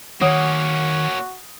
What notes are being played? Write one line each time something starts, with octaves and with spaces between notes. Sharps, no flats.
D#3 A#3 C#4 F#4 C#5 F#5 D#6